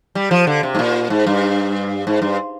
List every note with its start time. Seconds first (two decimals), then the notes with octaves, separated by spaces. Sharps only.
0.15 G3
0.31 F3
0.47 D3
0.63 C3
0.75 G#2
0.79 A#2
1.10 G#2
1.26 G2
2.07 G#2
2.22 G2